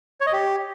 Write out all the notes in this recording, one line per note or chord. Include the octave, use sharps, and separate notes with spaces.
C#5
D#5
G4